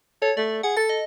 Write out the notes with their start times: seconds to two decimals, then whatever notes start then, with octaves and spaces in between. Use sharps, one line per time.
0.22 A4 C#5
0.37 A3 D5
0.63 G#4 F#5
0.77 A4 A6
0.89 D#5